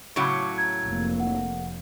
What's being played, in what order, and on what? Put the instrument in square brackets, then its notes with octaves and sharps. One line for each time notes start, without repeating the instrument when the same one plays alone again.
[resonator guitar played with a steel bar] A2 C#3 F#3 [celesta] C#6 D6
[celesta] A#5 G#6
[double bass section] F1 A#3
[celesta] F#5